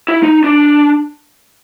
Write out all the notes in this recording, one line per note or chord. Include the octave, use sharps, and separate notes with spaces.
E4
D#4
D4